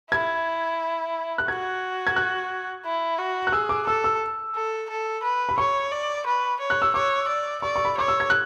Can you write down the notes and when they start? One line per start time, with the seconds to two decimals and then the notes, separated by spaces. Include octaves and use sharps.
0.11 E4 G#6
1.38 F#6
1.48 F#4 G#6
2.07 G#6
2.16 F#6
2.85 E4
3.19 F#4
3.47 F#6
3.52 G#4 E6
3.69 D6
3.87 A4 E6
4.04 E6
4.55 A4
4.89 A4
5.23 B4
5.49 B5
5.58 C#5 C#6
5.92 D5
6.26 B4
6.60 C#5
6.70 F#6
6.82 E6
6.94 C#5 D6
7.28 D5
7.62 D5 C#6
7.76 C#6
7.85 B5
7.97 C#5 D6
8.08 E6
8.20 G#6
8.30 F#6